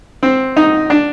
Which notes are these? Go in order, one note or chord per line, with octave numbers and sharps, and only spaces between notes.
C4
D#4
D4